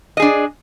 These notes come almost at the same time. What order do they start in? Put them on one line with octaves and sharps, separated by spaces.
D#5 G#4 D4